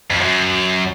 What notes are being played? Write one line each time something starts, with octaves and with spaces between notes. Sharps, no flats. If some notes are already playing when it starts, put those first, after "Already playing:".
F2
F#2